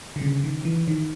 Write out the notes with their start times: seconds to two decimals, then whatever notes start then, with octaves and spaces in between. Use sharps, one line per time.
0.16 D3
0.21 C#3
0.44 D#3
0.65 E3
0.88 D#3